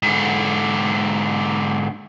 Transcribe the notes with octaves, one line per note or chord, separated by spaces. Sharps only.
G#2 D3